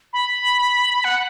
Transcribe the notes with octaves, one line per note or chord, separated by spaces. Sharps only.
B5
F#5